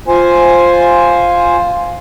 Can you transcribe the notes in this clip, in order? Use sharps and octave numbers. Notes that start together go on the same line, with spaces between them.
F4 C5 G#5